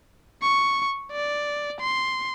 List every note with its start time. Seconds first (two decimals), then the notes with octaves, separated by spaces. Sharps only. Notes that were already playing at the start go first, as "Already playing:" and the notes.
0.42 C#6
1.12 D5
1.81 C6